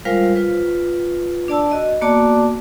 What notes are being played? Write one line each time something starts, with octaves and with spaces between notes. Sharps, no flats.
G3 G#3 F4 A#4 C5 F5
F4 B4
D4 D5 A5 E6
F#4 D#5
A#3 B3 F#4 D5 A5 D6